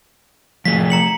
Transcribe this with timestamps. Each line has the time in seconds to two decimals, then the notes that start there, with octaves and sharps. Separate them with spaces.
0.65 F3 A3 G#4 B6
0.90 A#5 C#7 F#7